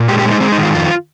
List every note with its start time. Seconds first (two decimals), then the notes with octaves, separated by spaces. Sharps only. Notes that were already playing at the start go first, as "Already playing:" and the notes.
Already playing: A#2
0.08 G#3 G4
0.19 G4
0.25 G#3
0.31 D#4
0.41 G#3 C4
0.52 D#4
0.58 D#3
0.63 F4
0.74 F2 F4